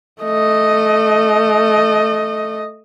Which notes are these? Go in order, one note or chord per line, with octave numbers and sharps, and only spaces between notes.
A3 D#5